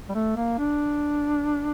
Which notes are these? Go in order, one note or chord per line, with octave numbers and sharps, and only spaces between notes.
G3
A3
A#3
D4